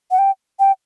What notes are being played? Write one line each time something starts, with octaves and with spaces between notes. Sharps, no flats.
F#5
G5
G5